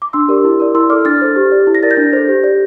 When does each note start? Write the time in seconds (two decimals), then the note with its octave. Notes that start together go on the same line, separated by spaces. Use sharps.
0.02 D6
0.13 D4 C6 E6
0.28 G4 A#4 D5
0.44 E4
0.60 A#4 D5
0.75 E4 C6 E6
0.90 A4 D5 D6 F6
1.05 D4 F6 A6
1.22 A4 C5
1.36 G4
1.52 D5
1.67 E4
1.75 A#6
1.83 A#4 D5 A6
1.91 G6 A#6
1.97 D4
2.13 A4 C5
2.28 G4
2.44 D5